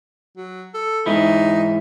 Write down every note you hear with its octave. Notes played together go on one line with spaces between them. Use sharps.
F#3
A4
G#2 E3 D#4 E4